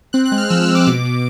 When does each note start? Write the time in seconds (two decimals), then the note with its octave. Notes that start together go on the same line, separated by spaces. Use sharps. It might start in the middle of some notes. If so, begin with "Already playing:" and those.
0.13 C4 F#6
0.25 F#6
0.32 G#3
0.38 F6
0.50 F3 E6
0.62 E6
0.68 C4
0.75 D6
0.87 B2 D6
1.05 B2